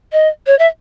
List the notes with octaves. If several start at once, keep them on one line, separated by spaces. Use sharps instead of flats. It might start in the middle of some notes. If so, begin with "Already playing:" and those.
D#5
C#5
E5